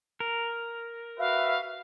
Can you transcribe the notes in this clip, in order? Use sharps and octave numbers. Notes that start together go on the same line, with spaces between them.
A#4
F#4 B4 E5 F5